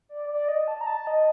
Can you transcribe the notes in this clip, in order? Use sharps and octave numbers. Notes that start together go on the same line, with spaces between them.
D5
D5
D#5
A5
A#5
A5
D#5